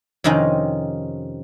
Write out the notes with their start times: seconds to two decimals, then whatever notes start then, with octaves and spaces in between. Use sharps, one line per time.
0.24 F2 C3 D#3 C#4 D#4